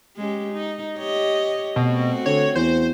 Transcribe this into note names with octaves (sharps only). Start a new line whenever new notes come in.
G#3 C#4 G4
D#4
G4 C#5 D#5
B2 A3 C4 F#4
D3 C#5
E2 C5